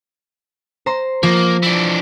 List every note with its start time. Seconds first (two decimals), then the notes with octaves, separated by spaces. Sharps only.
0.86 C5 A#5 C6
1.23 F3 A#3
1.63 E3 D4